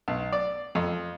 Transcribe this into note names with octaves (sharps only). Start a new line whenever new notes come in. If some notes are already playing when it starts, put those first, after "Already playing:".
B1
D5
F2